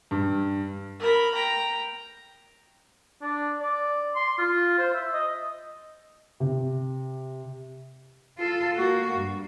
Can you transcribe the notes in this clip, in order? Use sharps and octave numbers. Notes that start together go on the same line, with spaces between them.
G2
A#4 B5
G5 A#5
D4
D5
C6
F4
C5
E5
D#5
C3
F4 A4
A#3 F#4
G2